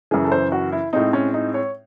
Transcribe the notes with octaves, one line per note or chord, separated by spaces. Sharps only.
F#2 C#3 E3 G#4
A4
C5
F#4
E4
A2 G#3 C4 D#4
C#4
D#4
C#5